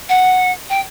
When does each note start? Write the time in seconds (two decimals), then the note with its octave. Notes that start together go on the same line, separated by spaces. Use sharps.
0.09 F#5
0.69 G5